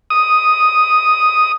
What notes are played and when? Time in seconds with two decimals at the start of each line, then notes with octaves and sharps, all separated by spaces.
0.10 D#6